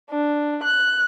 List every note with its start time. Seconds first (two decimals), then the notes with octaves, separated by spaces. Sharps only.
0.10 D4
0.63 F#6